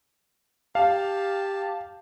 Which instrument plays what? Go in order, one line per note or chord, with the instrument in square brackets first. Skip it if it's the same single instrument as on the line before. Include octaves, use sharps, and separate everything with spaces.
[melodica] G4 A5 [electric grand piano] F5